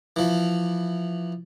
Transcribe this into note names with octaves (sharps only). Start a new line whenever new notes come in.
E3 F3